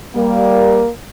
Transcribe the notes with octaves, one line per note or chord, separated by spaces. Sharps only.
G3 A#3